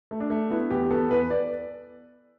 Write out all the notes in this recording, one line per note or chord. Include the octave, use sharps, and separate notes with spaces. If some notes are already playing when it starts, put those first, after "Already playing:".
A3
D4
A3
B3 E4
E2 G4
B3 A4
E2 B4
D5